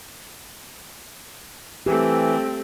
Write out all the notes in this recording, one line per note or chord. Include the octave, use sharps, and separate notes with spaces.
E3 A3 C4 G4